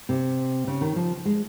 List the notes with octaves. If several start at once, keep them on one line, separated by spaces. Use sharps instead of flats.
C3
C#3
D#3
F3
G#3